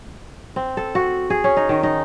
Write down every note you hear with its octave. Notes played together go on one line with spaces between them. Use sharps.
C4
A4
F#4
G#4
C#4
D#4
D#3
D#4